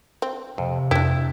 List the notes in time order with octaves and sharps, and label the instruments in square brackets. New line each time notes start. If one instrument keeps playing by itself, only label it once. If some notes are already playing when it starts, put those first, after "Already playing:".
[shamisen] C4
[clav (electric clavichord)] F2 [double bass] C3
[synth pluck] F2 [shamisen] D4 G4 [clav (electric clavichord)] E4